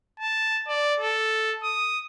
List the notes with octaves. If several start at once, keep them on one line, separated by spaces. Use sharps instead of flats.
A5
D5
A4
D#6